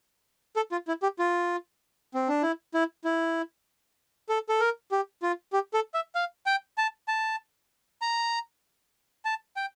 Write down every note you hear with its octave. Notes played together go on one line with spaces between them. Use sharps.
A4
F4
E4
G4
F4
C4
D4
E4
E4
E4
A4
A4
A#4
G4
F4
G4
A4
E5
F5
G5
A5
A5
A#5
A5
G5